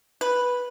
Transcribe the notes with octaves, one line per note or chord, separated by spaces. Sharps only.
B4